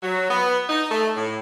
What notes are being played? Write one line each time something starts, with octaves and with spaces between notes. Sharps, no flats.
F#3
B3
D#4
A3
A2